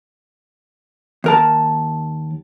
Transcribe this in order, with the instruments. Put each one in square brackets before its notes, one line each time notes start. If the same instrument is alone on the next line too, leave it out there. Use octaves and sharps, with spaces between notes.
[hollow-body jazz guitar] D#2 A#4 A5